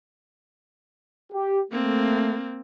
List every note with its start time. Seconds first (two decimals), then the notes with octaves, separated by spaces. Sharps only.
1.33 G4
1.72 A3 A#3 C4